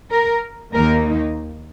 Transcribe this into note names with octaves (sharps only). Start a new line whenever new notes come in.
A#4
D#2 D#3 A#3 D#4 A#4